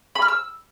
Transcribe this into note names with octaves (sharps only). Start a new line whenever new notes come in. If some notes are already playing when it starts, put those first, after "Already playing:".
B5
F6
E6